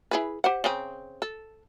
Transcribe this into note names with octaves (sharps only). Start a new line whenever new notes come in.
E4 G#4 B4
G4 C5 F#5
C#3 C4
A4